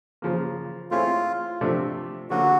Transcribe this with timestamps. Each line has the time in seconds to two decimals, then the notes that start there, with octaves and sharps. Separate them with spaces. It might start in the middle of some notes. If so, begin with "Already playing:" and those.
0.22 C#3 F3 A#3
0.91 A3 C4 E4 F4 G#4 C#5
1.61 C3 F3 A3 D4
2.30 D3 F#3 A#3 F#4